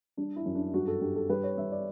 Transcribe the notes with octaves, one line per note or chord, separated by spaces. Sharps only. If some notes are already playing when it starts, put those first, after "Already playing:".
G3 D4
E4
F#2
D4
G2 F#4
A4
G2 G4
A4
G3 B4
C#5
G3 E5
D5